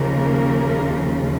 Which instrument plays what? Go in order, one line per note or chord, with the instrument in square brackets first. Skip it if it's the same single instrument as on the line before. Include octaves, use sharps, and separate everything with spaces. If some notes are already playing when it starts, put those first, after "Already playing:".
Already playing: [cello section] D#2 C#3 F3 A#3 A#4